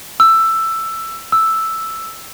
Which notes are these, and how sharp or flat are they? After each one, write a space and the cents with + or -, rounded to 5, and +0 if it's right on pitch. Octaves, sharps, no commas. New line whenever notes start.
E6 +10
E6 +0